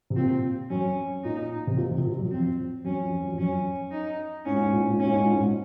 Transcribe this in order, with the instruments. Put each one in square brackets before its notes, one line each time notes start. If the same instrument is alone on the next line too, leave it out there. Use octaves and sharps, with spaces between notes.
[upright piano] C3
[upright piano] A#2 [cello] C4
[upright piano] F#2 [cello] C#4
[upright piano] A#2 [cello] D#4
[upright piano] C3
A#2
C3
A#2
F#2
[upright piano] F2 [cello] C4
[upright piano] F#2 [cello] C#4
[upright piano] F2
F#2
F2
[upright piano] F#2 [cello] C#4
[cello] D#4
[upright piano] G#2 [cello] C#4
[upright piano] A#2
G#2
A#2
G#2
A#2
[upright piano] G#2 [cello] C#4
[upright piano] A#2
G#2
A#2
G#2